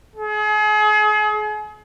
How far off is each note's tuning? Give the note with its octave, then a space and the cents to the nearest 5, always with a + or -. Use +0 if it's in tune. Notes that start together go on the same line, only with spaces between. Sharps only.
G#4 +35